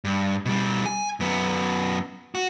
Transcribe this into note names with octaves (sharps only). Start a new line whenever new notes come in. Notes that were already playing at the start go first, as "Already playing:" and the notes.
G2
B2 G3
G#5
F#2 B3
F#4